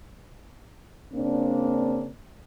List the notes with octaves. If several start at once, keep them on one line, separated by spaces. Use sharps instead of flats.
C#3 A#3 C4 D4